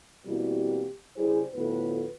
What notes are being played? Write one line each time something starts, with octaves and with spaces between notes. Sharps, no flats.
B2 E3 G3 A#3 C4 G4
C#3 G3 E4 G#4 C5
D2 A2 F3 B3 B4